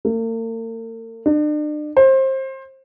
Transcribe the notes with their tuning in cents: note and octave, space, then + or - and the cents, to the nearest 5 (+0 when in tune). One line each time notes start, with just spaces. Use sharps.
A#3 -45
D4 +40
C5 +25